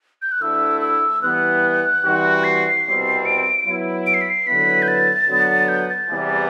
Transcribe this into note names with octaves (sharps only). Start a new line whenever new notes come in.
G6
F#6
D2 D3 A3 E4 E6
E6
E3 G3 B3 F#6
E3 G3 C4 F#4
C7
C2 B2 G3 C4
D7
F#3 B3 E4
D7
C7
B6
C7
D3 F#3 B3 E4 B4 B6
G6
A6
D3 F#3 B3
G6
A6
E2 C3 E3 G3 B3